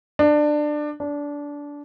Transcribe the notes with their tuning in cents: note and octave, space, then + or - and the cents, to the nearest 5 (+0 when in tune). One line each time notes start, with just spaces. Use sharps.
D4 +20
D4 -20